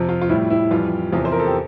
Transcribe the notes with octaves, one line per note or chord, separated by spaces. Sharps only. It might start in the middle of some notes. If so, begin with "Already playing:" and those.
Already playing: F2 C3 F3
F4
F4
A2 G3 E4
E4
F2 E3 G3 F4
E2 C3 F3 F4
C5
A#4
A4
G4